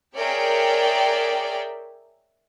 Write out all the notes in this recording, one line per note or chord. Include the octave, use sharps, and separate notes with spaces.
G#4 A#4 C#5 D5 E5 G5